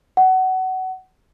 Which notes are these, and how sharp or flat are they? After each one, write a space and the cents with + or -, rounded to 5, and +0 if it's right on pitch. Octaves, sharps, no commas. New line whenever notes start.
F#5 +20